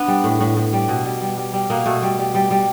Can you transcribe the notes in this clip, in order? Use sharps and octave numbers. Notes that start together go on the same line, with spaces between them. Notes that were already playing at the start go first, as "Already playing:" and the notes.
Already playing: B3 D4
G3
A2
A2
A2
G3
B2
G3
G3
G3
G3
B2 A#3
B2 A3
G3
G3
G3
G3